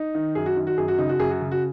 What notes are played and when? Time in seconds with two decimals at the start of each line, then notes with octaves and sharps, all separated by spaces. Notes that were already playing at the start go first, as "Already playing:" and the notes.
Already playing: D#4
0.15 D#3
0.35 F#2 G#4
0.46 F#4
0.57 D#3
0.67 F#4
0.77 F#2 G#4
0.88 F#4
0.98 C#3 D#4
1.09 F#4
1.19 F#2 G#4
1.31 F#4
1.41 C#3
1.51 F#4